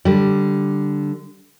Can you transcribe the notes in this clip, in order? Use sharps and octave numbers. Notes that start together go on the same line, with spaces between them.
D3 G3